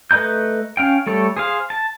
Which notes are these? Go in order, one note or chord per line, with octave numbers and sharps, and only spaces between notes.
A3 B4 D#5 A#5 G6
C#4 F5 G5
G3 A3 A4 C#5
G#4 C5 F5
A5